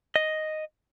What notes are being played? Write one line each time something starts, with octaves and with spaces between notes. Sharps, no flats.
D#5